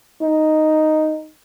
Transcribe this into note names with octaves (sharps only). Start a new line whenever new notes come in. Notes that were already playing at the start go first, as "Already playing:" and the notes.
D#4